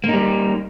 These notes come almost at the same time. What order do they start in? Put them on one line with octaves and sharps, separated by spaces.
A#3 D#4 G3